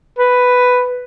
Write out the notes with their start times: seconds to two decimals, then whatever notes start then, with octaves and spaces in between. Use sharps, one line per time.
0.19 B4